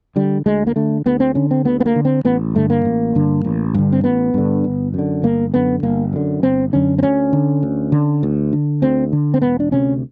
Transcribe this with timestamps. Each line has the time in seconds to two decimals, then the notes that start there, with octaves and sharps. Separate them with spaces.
0.16 D3 G3
0.46 D2 G#3
0.67 A#3
0.76 D3 A3
1.06 D2 B3
1.20 C4
1.35 D3 C#4
1.51 C4
1.65 D2 B3
1.80 B3
1.86 A#3
1.96 D3
2.05 C4
2.25 A1 B3
2.55 G2 D3 A3
2.70 A#3
2.85 A1
3.15 G2 D3
3.44 A1
3.74 G2 D3
3.92 C4
4.04 A1 B3
4.34 G2 D3
4.64 G1
4.94 F#2 D3
5.23 G1 A#3
5.54 F#2 D3 B3
5.83 G1 A#3
6.13 F#2 D3
6.43 G1 C4
6.73 F#2 D3 C#4
6.98 C4
7.03 D2 C#4
7.33 D3
7.63 D2
7.92 D3
8.23 D2
8.53 D3
8.82 D2 C4
9.13 D3
9.34 C4
9.42 E1 B3
9.60 D4
9.72 D2 C3 C#4